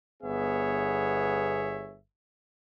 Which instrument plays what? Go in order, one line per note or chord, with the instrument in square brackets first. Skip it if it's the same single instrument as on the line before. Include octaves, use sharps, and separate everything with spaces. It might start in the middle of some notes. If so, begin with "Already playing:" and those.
[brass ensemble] G1 B3 G#4 C#5 E5